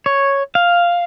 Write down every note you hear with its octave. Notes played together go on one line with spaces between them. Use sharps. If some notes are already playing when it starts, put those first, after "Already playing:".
C#5
F5